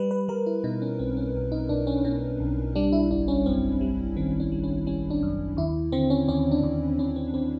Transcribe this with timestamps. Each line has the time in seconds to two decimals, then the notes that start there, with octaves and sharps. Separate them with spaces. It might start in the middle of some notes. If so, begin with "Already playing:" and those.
Already playing: G3 B4
0.11 B4
0.28 G3 A#4
0.46 E4
0.64 B2 D#4
0.82 C#4
0.99 B1 C4
1.17 C#4
1.34 B1
1.52 D#4
1.69 B1 D4
1.87 C#4
2.05 B2 C#4
2.40 B1
2.75 G3 D4
2.93 E4
3.11 G1 D4
3.28 C#4
3.46 F#2 C4
3.81 G3
4.17 D#3 C4
4.40 C#4
4.52 G3
4.64 C#4
4.87 G3 C#4
5.10 D4
5.23 F#2
5.57 D#2 E4
5.92 D3 C4
6.10 C#4
6.28 D#2 C#4
6.51 D4
6.63 D#2
6.99 D#2 C#4
7.16 C4
7.34 D#2 C4